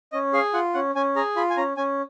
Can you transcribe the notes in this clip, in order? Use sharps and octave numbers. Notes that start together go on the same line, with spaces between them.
C#4 D#5
G#4 F5
F4 F#5
C#4 F#5
C#4 G#5
G#4 A#5
F4 B5
G#5
C#4 A#5
C#4 G#5